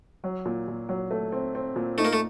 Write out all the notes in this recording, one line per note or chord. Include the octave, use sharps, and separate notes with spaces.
F#3
A#2
A#2
F#3
A3
C4
C4
A#2
A3 D#4
A#3
A3